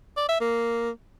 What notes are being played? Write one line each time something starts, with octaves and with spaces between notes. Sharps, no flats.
D5
E5
A#3